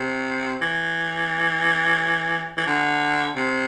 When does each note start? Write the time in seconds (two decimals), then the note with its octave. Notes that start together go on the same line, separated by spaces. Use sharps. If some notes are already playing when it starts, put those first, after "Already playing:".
Already playing: C3
0.62 E3
2.57 E3
2.67 D3
3.36 C3